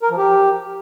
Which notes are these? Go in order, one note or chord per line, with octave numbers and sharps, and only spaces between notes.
A#4
F3
G4